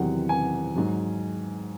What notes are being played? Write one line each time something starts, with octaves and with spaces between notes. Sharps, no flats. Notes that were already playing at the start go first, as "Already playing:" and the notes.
Already playing: E2 C3 D#3 F#3 F#5
G#5
G#2 F#3